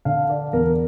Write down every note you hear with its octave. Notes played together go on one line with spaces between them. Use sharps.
D3 F5
D5
E2 A#4